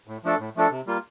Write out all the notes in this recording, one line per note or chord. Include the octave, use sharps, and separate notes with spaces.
A2
F3 A3 D4 A4
A2
F3 A3 D4 A4
C3
G3 A#3 F4